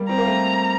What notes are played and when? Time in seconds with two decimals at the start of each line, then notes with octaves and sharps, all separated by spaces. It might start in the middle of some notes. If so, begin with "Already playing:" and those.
Already playing: G3 A#3
0.09 C4 A#5
0.18 A#3
0.26 A3 C4